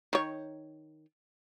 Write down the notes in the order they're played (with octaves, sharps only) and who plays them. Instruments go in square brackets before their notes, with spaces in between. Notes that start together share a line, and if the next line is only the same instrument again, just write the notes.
[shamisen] D#3 C#5